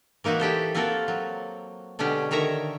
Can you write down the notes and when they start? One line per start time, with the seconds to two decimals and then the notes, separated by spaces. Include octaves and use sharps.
0.24 E3 A#3 D#4 E4 F#4
0.40 E4 G4 A4 C5
0.75 A#3 C4 F4 F#4 A4 A#4
1.08 F#3
1.99 B2 D3 G#3 C#4 G4
2.31 D3 D#3 C#5 E5 A#5